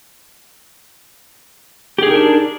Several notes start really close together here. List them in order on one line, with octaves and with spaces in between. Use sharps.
G4 G#4 D#4 A#4 D4